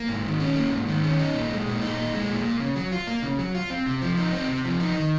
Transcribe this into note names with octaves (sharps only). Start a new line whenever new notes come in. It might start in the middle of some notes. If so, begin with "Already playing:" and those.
Already playing: A#3
G#2
D#3
C#4
A#3
G#2
D#3
C#4
D#4
A#2
G#3
A#2
D#4
A#2
G#3
A#2
A#3
C#3
F#3
F4
A#3
C#3
F#3
F4
C4
C3
F3
D#4
C4
C3
F3
D#4
D#3